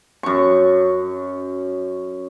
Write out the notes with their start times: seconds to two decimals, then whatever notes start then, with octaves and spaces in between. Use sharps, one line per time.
0.23 F#2 C#6